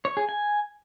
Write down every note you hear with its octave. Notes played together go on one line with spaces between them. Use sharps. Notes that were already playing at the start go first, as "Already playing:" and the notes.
C#5
G#4
G#5